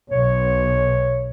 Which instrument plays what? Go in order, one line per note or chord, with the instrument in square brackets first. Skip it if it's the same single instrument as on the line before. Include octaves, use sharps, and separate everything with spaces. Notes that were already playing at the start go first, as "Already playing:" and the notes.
[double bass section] B1 [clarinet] C#5